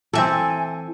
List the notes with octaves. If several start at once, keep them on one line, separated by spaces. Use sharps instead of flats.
E3 C4 A4 E5 G#5